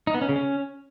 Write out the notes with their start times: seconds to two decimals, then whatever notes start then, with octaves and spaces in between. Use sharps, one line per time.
0.07 D#4
0.14 B3
0.22 C#4
0.29 C#3
0.36 C#4